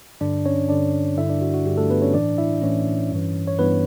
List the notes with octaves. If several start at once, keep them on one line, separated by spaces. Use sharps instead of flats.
G2 D3 D4 D5
C#4 C#5
G2 D3 D4 D5
G2 D3 E4 E5
D4 D5
F#4
F#4
G2 D3 G4
A3 A4
B3 B4
C#4 C#5
A2 E3 D4 D5
E4 E5
A2 E3 C#4 C#5
G2 E3
C#5
G2 E3 B3 B4